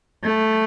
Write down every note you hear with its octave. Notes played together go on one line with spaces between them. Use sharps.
A3